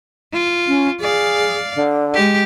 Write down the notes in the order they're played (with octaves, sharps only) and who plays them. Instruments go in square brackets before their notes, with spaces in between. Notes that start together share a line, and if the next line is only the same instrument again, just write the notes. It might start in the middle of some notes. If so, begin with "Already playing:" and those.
[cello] F4
[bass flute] C#4
[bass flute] G#4 [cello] D5 F5
[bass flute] D3
[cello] G#3 G4